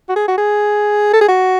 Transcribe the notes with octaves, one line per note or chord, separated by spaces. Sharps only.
F#4
G#4
F#4
G#4
A4
G#4
F#4